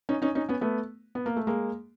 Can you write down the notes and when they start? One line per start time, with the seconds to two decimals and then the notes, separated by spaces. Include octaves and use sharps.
0.09 C#4 D#4
0.22 C#4 D#4
0.35 C#4 D#4
0.49 B3 C#4
0.61 A3 B3
1.15 B3
1.26 A#3
1.37 A3
1.47 G#3 A#3